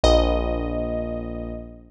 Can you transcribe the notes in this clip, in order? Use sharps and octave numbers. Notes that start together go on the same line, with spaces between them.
A#1 D#5